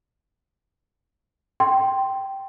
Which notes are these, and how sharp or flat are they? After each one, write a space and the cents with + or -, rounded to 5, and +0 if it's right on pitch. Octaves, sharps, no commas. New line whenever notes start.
G5 -10 C6 +0